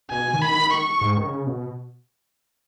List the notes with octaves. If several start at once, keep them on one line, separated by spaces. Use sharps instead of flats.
B2 G#5
D#3
B5
D#3
C#6
G#2
D#3
C#3
B2